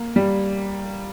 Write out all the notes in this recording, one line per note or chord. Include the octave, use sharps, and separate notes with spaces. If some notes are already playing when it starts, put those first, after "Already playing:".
Already playing: A#3
G3